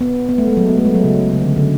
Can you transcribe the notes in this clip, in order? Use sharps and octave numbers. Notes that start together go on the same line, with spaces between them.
B3
B3
A3
G#3
F#3
B3
A3
G#3
F#3
C#3
C#3
D3
D3